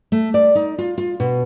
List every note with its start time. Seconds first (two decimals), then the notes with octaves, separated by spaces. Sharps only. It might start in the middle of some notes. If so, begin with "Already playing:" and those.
0.12 A3
0.34 D5
0.55 D#4
0.78 F4
0.98 F4
1.20 B2